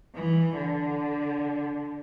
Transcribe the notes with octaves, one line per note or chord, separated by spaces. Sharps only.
E3
D3